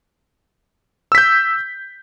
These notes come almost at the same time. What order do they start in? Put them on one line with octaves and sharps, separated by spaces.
E6 B6 G6